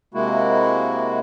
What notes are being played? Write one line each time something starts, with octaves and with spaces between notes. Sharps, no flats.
C3 G#3 A#3 E4 F#4